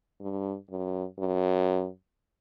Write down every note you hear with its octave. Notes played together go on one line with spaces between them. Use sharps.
G2
F#2
F#2